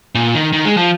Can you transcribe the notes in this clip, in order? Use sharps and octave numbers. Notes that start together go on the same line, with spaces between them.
A#2
D#3
D#3
G#3
F3